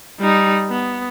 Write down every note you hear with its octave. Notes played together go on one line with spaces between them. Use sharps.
G3 D#4
B3